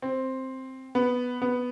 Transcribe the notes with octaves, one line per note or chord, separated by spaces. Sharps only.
C4
B3
B3